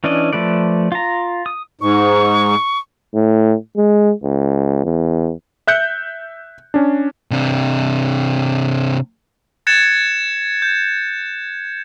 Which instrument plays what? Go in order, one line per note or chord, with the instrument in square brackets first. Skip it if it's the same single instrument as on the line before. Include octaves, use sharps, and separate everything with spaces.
[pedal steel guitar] E3 C#4 D4 D5 D#5
F3 A3 B4 D5
F4 A#5
D#6
[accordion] G#2 [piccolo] C#6
[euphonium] A2
G#3
C#2
E2
[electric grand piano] E5 F#6 G6 C#7
C#4 D4
[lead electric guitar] C3 D4
[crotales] F#6 G#6 A6 C#7 E7
G6